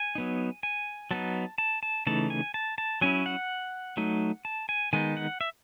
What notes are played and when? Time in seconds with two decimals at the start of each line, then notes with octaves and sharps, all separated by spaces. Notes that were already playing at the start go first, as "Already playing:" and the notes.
Already playing: G#5
0.15 F#3 B3 D#4
0.63 G#5
1.11 F#3 B3 D#4 A5
1.58 A5
1.83 A5
2.07 C#3 E3 A3 D#4 A5
2.30 G#5
2.54 A5
2.78 A5
3.01 F#3 C#4 E4 G#5
3.26 F#5
3.97 F#3 A3 D#4
4.45 A5
4.69 G#5
4.93 D#3 G#3 B3 D#4 G#5
5.17 F#5
5.41 E5